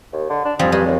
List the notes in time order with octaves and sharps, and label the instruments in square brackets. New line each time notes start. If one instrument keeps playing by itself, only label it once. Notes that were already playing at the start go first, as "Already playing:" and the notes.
[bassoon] D#2
D3
D4
[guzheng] F2 G3 G#4 [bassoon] F3
[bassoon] G2 [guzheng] G#3
[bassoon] D#2